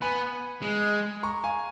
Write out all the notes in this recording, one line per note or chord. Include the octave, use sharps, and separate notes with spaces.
B3 G#5 B5
G#3
A#5 C#6
F5 G#5